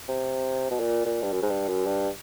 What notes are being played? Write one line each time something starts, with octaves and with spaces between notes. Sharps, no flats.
C3
B2
A#2
A#2
G2
F#2
G#2
G2
F#2
G2